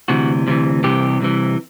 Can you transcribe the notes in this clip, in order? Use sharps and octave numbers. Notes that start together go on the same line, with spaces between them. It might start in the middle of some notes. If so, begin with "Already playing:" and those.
D2 C3 E3 F#4
D2 C3 E3
C2 C3 E3 G4
C2 C3 E3